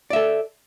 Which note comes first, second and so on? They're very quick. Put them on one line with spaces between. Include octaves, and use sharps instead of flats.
D5 E5 A4